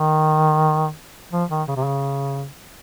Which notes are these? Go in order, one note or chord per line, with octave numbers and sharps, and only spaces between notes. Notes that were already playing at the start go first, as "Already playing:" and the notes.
Already playing: D#3
F3
D#3
C#3
C3
C#3